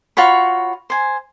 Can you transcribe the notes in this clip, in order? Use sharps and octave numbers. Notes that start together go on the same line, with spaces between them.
F4 F#4 C#5 B5
C5 G#5